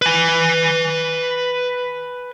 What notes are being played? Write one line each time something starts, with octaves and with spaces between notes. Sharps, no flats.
B4 G#5